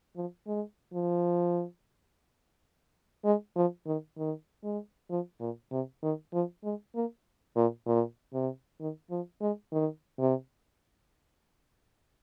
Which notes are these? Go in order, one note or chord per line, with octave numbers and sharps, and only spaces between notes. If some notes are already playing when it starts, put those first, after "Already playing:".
F3
G#3
F3
G#3
F3
D#3
D#3
G#3
F3
A#2
C3
D#3
F3
G#3
A#3
A#2
A#2
C3
D#3
F3
G#3
D#3
C3